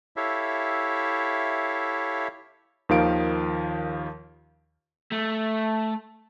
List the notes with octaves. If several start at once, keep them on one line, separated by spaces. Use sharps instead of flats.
E4 G4 A4 C#5 E5 F5
D#2 D#3 F3 F5 D7
A3